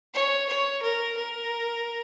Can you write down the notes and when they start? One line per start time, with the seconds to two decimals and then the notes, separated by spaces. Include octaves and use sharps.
0.14 C#5
0.49 C#5
0.82 A#4
1.17 A#4